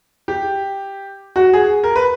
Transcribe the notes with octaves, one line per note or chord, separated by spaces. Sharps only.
G4
F#4
G#4
A#4
B4